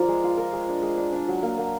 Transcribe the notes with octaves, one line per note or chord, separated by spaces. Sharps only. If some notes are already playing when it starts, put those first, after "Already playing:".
Already playing: F3 A#4 D5
G#3
F4
A#4
G#3
D4
G#3
D4
D4
F#3
A#3
A#3